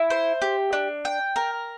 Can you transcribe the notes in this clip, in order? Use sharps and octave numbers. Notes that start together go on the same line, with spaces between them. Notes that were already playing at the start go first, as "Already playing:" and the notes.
Already playing: E4
C5
G4
D4
G5
A#4